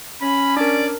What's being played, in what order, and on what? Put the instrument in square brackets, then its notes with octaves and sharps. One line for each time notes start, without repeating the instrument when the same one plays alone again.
[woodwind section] C#4 [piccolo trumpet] B5
[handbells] D4 A#4 [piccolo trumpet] D5